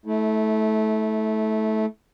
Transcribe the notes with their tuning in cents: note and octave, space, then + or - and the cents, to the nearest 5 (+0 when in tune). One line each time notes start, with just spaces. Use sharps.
A3 -15 E4 -35